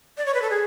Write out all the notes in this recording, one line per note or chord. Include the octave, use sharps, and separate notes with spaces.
D5
C#5
B4
A4
G#4